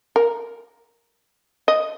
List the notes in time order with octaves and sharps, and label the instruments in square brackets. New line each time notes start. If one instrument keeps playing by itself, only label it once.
[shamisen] A#4
D#5